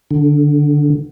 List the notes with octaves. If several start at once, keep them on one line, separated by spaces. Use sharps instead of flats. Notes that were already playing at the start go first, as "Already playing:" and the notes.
D3